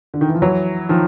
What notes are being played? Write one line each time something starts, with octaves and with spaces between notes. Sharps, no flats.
D3
D#3
E3
F3
E3 F#3
D#3 F3